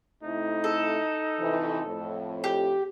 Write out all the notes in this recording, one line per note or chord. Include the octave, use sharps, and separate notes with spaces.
C3 A3 D#4 E4
A4
F2 C3 E3
F2 A2
G4